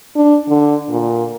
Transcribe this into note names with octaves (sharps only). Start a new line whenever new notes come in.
D4
D3
A#2